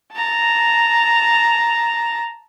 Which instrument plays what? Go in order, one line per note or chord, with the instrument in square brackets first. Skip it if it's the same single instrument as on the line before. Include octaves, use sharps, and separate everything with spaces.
[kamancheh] A5 A#5